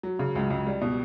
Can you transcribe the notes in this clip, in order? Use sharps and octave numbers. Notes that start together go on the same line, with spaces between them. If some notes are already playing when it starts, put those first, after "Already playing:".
F#3
C#3
C#2
C#2
G3
B2